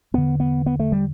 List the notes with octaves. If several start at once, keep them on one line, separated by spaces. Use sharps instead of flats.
E2 D3 B3
B3
B3
A3
G3